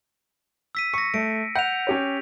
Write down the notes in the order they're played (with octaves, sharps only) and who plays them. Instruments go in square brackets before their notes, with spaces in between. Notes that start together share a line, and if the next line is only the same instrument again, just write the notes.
[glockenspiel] E6 B6 D#7
[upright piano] C#6 [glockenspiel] A#6 C#7
[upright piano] A3 [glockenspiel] D7
[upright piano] F#5 [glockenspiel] G6 F7
[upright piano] C#4 G4 C#5